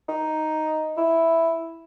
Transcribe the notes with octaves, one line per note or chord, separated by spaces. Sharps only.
D#4
E4